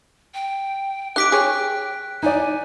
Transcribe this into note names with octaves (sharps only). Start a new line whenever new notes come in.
G5
D#4 G4 D6 F#6 B6 D7
G#4 C#5 G5
D#4 D5 G#5